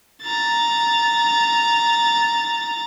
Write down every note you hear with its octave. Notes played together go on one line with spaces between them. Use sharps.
A#5 A6